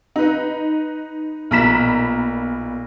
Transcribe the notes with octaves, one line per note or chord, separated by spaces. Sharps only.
D#4 B4
B1 A#2 A#5 B5 B6 E7